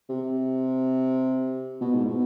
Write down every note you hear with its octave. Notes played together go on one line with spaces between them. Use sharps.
C3
B2
G#2
B2